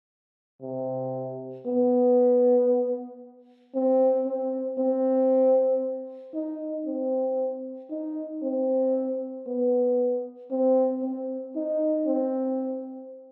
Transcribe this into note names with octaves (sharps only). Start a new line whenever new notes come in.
C3
B3
C4
C4
C4
D#4
C4
D#4
C4
B3
C4
C4
D#4
C4